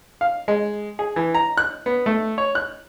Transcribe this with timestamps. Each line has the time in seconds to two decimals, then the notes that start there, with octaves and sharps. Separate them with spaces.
0.21 F5
0.48 G#3
0.99 G#4
1.16 E3
1.34 A#5
1.58 F#6
1.86 B3
2.06 A3
2.38 C#5
2.55 F#6